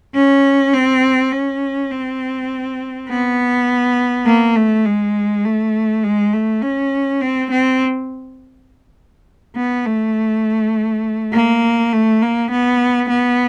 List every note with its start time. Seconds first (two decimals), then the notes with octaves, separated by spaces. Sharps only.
0.15 C#4
0.74 C4
1.32 C#4
1.91 C4
3.09 B3
4.26 A#3
4.56 A3
4.85 G#3
5.45 A3
6.04 G#3
6.33 A3
6.62 C#4
7.21 C4
7.51 C4
9.56 B3
9.86 A3
11.33 A#3
11.92 A3
12.22 A#3
12.51 B3
13.09 B3